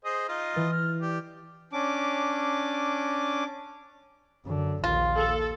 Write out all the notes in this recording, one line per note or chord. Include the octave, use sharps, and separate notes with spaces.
G#4 C5 D#5
D#4 F4 D#5
E3 A6
F6
G4 D5
C#4 D4 D6
F#2 D3
A#1 D#2 F4
A4